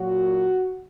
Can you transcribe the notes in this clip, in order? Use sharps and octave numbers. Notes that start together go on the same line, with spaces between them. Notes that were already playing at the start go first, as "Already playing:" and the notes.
Already playing: A#2 F#3 F#4